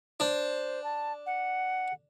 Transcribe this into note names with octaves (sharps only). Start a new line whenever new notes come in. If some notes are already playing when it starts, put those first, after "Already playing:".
D4 C5
A5
F#5